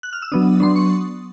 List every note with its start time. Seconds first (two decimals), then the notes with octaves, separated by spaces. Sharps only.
0.03 F#6
0.13 F6
0.22 E6
0.32 F#3 B3 D4 D#6
0.60 F#3 B3 D4 C6
0.76 C#6